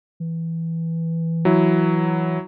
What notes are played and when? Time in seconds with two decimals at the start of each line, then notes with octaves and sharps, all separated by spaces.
0.20 E3
1.45 F#3 E4